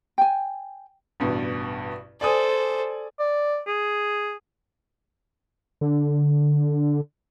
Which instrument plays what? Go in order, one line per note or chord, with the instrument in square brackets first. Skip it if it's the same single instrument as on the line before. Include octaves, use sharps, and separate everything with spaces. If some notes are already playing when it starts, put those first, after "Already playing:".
[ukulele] G5 G#5
[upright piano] A1 G2 B2
[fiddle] A4 C5 [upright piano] D5 G#5 D#6
[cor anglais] D5
G#4
[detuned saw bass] D3